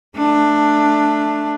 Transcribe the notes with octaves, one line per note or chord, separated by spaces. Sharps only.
A3 D4